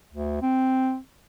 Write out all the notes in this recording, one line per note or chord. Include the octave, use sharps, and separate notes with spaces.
D2
C4